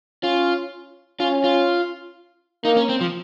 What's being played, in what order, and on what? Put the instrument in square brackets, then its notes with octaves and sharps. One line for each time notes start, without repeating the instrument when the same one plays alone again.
[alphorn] C#4 [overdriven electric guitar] F4
[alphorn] C#4 [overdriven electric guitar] F4
[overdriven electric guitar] F4
[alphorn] A#3 [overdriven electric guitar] D#4
[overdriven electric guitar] C#4
C4
F3